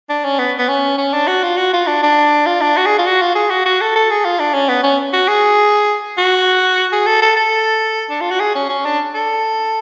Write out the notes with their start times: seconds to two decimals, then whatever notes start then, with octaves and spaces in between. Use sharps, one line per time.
0.09 D4
0.25 C#4
0.39 B3
0.58 B3
0.68 C#4
0.98 C#4
1.13 D4
1.27 F#4
1.43 F4
1.57 F#4
1.73 F4
1.87 D4
2.03 D4
2.46 F4
2.61 D4
2.77 F#4
2.86 G#4
2.98 F4
3.06 F#4
3.21 F4
3.35 G#4
3.50 F#4
3.65 F#4
3.81 A4
3.96 A4
4.10 G#4
4.25 F4
4.39 D4
4.54 C#4
4.69 B3
4.83 C#4
5.13 F#4
5.28 G#4
6.18 F#4
6.92 G#4
7.06 A4
7.22 A4
7.36 A4
8.10 D4
8.21 F4
8.30 F#4
8.40 G#4
8.55 C#4
8.69 C#4
8.85 D4
9.14 A4